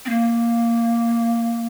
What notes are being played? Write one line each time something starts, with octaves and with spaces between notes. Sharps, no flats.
C4
A#3